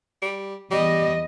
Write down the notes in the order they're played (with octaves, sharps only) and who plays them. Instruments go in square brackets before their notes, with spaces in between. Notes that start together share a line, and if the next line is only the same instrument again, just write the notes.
[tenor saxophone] G3
[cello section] E2 D#5 [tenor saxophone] G3